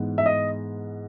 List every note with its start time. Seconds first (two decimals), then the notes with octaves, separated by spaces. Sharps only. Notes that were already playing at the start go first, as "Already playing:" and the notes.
Already playing: G#2 E3 G#3 B3
0.18 E5
0.26 D#5